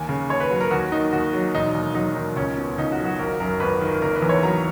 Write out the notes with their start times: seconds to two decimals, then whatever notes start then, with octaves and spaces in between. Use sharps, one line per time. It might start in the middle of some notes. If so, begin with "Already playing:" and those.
Already playing: D#2 G#5
0.09 C#3
0.29 D#2 C#5
0.40 B4
0.50 F#3
0.61 A#4
0.71 D#2 F#4
0.91 D#3 D#4
1.13 D#2 F#4
1.33 F#3
1.55 E1 D#4
1.74 D#2
1.95 F#3 D#4
2.15 D#3 D#4
2.36 C#2 C#4
2.57 B2
2.78 C#2 D#4
2.92 F#4
2.99 F#3
3.05 F#4
3.19 G#1 A#4
3.40 F#2 A#4
3.60 G#1 B4
3.81 D#3
4.02 F#1 A#4
4.16 B4
4.22 E2
4.29 C#5
4.43 F#3 A#5